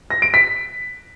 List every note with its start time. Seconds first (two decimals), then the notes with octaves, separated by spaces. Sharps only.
0.10 A#6
0.22 D7
0.34 B6